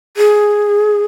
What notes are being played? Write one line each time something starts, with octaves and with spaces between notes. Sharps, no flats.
G#4